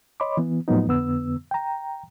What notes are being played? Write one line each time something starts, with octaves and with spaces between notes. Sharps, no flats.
C#5 D#5 B5 C6 D6
E3 B3
A2 F3 F#3 A#3 B3 D#4
F2 D3 B3 E6
G5 A#5